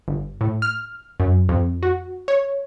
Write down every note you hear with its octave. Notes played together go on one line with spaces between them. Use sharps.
G1
A2
F6
F#2
F2
F#4
C#5